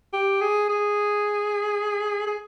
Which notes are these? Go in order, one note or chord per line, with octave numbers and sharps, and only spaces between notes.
G4
G#4
G#4
G#4